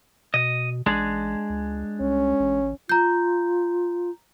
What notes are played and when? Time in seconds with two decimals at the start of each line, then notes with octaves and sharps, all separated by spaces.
0.34 B2 D#5
0.86 A1 G#3 D4 G#4
1.50 C#2
2.00 C2 C#4
2.40 A1
2.89 F4 A#5 G6